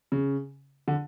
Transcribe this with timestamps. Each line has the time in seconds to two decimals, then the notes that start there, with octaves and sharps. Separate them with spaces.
0.12 C#3
0.88 D3